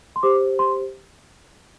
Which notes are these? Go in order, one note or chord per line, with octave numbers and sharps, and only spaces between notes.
C6
G4 C5 D6
C6